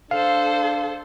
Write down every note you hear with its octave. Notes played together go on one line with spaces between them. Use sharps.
D4 A4 C5 F5